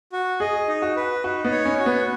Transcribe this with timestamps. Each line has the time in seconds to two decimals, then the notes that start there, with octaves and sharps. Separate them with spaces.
0.12 F#4
0.40 G#4 D#5
0.68 D#4
0.82 F#4
0.96 B4
1.24 D#4 F#4
1.44 B3
1.51 C#5
1.65 C#4
1.80 F#4
1.86 B3